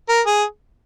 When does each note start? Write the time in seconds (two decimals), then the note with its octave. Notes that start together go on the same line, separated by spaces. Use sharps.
0.09 A#4
0.26 G#4